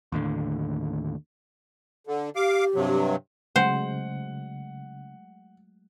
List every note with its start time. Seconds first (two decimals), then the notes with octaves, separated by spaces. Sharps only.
0.12 D#2 A2 D3
2.07 D3
2.36 G4 F5 D6
2.75 G2 C3 F#3
3.56 C#3 F#3 G#3 A3 C5 F#5